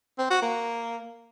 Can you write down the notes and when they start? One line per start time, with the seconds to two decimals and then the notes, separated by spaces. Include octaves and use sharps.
0.19 C4
0.30 F#4
0.42 A#3